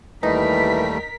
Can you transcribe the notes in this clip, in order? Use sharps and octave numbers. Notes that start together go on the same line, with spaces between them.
D#2 E3 G3 A3 D#4 A#4 B6